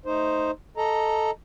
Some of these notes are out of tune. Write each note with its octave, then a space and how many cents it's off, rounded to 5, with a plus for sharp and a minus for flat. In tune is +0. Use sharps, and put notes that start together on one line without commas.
A3 +0 D#4 +0 C5 +0
A4 +0 D#5 +0 A#5 +0